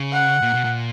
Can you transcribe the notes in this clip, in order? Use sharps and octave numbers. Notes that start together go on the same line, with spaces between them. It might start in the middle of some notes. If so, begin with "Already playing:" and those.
Already playing: C#3
F#5
A#2
B2
A#2